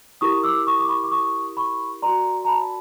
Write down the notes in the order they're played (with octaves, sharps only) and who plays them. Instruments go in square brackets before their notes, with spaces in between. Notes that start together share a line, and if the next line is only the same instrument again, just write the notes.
[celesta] E4 G4 A#4 C#6 D#6
D6 E6
C#6 D#6
D6
B5 C#6
D6
C#6 D#6
B5 C#6
F#4 A#4 D5 A#5 C6
A#5
A5 B5